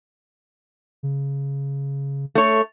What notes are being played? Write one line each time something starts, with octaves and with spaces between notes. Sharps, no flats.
C#3
A3 C#5